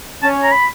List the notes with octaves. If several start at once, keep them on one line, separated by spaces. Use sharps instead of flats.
C#4 A5
A#5
B5